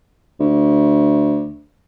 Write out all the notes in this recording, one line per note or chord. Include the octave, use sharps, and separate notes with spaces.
D2